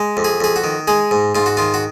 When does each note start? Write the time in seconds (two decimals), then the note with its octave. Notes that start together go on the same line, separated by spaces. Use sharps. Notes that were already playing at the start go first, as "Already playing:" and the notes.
Already playing: G#3
0.17 F2
0.24 G#4
0.40 F2 G#4
0.56 F#4
0.64 D#3
0.88 G#3 G#4
1.11 G#2
1.35 G#2 F4
1.46 F#4
1.57 D#3 F4
1.74 F#4